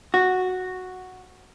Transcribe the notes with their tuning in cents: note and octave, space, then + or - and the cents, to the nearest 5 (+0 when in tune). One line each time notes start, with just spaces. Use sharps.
F#4 -5